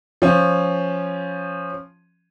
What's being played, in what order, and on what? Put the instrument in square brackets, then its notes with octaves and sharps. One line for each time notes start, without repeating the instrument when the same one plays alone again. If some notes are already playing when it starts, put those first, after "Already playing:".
[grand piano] F3 C#4